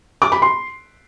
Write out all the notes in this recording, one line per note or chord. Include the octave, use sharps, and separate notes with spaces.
D6
B5
C6